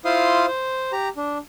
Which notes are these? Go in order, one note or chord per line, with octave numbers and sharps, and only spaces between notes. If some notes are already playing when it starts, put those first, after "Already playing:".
E4 F4 C5 F5 C6 D#6
C5
G4 A#5
D4